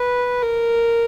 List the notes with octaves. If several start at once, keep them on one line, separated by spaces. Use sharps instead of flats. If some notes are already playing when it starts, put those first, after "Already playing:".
Already playing: B4
A#4